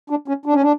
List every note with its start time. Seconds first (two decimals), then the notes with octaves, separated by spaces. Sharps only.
0.10 D4
0.28 C#4
0.46 D4
0.53 C#4
0.62 D4